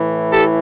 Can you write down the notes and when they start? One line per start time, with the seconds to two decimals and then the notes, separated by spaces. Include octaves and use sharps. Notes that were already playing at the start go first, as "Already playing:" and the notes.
Already playing: A2 E3
0.30 G4 A4